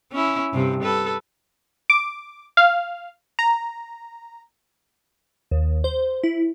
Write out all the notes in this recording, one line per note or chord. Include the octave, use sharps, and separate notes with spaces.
C#4 E4
G2 C3
A4 B4
D6
F5
A#5
D#2
C5
E4